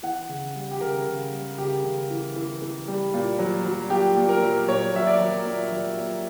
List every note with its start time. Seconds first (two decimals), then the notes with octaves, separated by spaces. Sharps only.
0.03 E3 F#5
0.28 C#3
0.55 G3
0.71 G4
0.81 C#3 A#4
1.07 C#3
1.32 G3
1.58 C#3 G4
1.83 C#3
2.10 E3
2.36 E3
2.62 E3
2.88 G3
3.14 A#2
3.39 F#3
3.65 F#3
3.90 A#2 G4
4.16 A#2
4.29 A#4
4.42 F#3
4.68 A#2 C#5
4.94 F#3 E5
5.07 D5
5.20 F#3
5.45 A#2
5.71 F#3
5.97 A#2